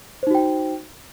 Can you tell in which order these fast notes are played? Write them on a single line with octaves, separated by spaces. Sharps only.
C5 D#4 F#4 G5